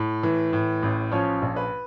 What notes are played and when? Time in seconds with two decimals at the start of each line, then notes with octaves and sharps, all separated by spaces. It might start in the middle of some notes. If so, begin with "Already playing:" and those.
Already playing: A2
0.23 E3
0.53 A2
0.83 A1
1.11 F3 C#4 C#5
1.42 A#1
1.56 B4